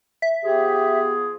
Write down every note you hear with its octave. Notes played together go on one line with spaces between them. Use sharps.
E5
F3 B3 G4 G#4